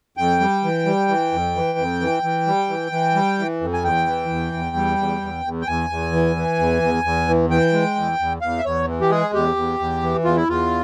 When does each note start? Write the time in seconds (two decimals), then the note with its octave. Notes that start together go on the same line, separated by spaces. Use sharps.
0.17 F2 G5
0.41 G3
0.64 E3
0.86 G3
1.09 E3
1.32 F2
1.55 E3
1.78 F2
2.01 E3
2.23 E3
2.47 G3
2.69 E3
2.92 E3
3.15 G3
3.38 E3
3.61 F2
3.73 G#5
3.83 E2 G5
4.07 E3
4.29 E2
4.53 E2
4.76 G3
4.98 E2
5.21 E2
5.45 E2
5.62 G5
5.67 E2 G#5
5.90 E2
6.12 E3
6.36 E3
6.59 E2
6.82 E2
7.04 E2
7.28 E3
7.50 E3 G5
7.73 G#3
7.96 E2
8.19 E2
8.41 E2 F5
8.58 E5
8.65 E2 C#5
8.88 E3
9.01 G4
9.10 G#3 G#4
9.34 E2 G4
9.56 E2
9.79 E2
10.03 E3
10.25 E2 F4
10.36 E4
10.47 E2 F4